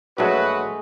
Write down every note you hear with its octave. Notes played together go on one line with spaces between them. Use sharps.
A#1 F#3 G#3 A3 F#4 B4